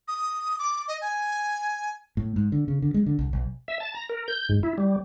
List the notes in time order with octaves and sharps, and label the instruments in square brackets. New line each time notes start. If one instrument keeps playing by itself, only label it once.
[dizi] D#6
D6
D#5
G#5
[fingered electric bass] A2
G#2
D3
C#3
D3
G#3
D3
C2
B1
[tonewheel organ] E5
A5
A#5
A#4
G6
G#2
E4
G3